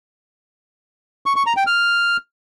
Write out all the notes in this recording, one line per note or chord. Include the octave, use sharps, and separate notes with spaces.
C#6
C#6
A#5
G5
F6